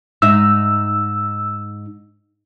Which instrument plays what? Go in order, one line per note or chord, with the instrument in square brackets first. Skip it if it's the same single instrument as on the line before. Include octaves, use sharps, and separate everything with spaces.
[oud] G#2 D#4 E5 [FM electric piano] E6